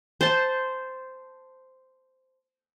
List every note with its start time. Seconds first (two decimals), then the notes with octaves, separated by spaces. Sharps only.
0.21 C5 A5